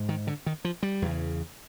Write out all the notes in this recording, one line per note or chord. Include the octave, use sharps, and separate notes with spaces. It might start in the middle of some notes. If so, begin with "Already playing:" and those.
Already playing: G#2
D#3
D3
D#3
F3
G3
E2 C#3